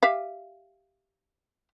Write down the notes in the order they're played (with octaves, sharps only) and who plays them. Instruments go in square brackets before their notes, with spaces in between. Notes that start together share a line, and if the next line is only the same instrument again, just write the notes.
[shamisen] G4 E5 F5